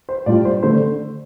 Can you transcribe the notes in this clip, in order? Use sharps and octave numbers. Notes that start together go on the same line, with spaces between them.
C5
A2 G3 D4 F4 D5
C5
D3 A3 D4 C5